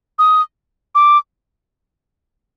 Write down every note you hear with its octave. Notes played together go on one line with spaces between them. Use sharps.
D#6
D6